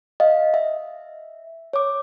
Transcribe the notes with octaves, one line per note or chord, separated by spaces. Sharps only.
D#5 F5
E5
C#5 D6